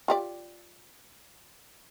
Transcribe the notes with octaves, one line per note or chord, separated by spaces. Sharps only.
F4 G4 D5